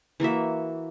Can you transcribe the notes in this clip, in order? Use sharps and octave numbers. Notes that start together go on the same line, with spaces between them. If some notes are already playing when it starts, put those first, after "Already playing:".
E3 A#3 F#4 E5